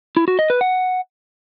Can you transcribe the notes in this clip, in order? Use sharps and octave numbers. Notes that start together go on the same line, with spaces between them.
E4
F#4
D#5
B4
F#5